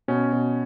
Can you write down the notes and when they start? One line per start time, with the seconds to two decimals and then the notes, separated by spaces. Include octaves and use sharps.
0.08 B2 C#4
0.32 B2